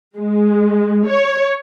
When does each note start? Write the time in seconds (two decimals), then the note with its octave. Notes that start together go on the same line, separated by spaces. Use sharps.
0.17 G#3
1.06 C#5